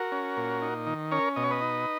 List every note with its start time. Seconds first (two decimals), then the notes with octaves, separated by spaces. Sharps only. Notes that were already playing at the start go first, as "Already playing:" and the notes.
Already playing: F#4 A#4
0.12 C#4
0.37 A#2
0.62 D#4
0.87 D#3
1.11 C#4 A#4 C#5
1.36 B2 D#5
1.44 C#5
1.51 B4 D#5
1.61 D#4